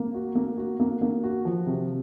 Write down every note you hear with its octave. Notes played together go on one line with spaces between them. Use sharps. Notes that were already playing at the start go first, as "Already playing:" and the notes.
Already playing: A#3
F#4
A#3
F#4
A#3
A#3
F#4
F3
C3